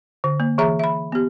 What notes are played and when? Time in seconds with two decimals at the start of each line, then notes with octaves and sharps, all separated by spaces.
0.24 D3
0.40 A#3
0.58 E3 G#4 E5 A#5
0.79 E5 B5
1.12 B3 G4